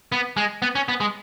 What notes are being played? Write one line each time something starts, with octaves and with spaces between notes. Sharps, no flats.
B3
G#3
B3
C#4
B3
G#3